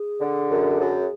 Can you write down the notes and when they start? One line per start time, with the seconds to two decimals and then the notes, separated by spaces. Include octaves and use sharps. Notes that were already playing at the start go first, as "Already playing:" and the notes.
Already playing: G#4
0.20 D3
0.50 F#2
0.80 F#2